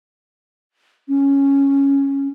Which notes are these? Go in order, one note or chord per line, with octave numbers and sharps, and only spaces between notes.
C#4